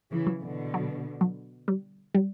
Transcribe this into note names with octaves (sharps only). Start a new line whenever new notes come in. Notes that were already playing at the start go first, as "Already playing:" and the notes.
C#3 E3
F#3
B2 D3
F#3
F#3
G3
G3